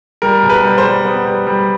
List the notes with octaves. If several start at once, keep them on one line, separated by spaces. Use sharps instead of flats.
G3 A#4
B2
B4
G3
C5
G3
B3
G3
G3